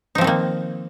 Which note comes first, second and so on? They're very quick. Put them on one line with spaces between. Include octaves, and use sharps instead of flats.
D#4 F3 C4 D#3 A#3